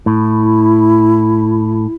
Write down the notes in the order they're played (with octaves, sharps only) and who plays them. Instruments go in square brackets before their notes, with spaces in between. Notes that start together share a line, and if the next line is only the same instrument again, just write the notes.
[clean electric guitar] A2 [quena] E4